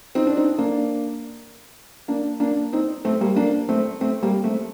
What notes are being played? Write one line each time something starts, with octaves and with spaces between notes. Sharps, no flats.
C4 D#4
D4
C4 D#4
A#3 D4
A#3 D4
A#3 D4
C4 D#4
A3 C4
G3 A#3
A#3 D4
A3 C4
A3 C4
G3 A#3
A3 C4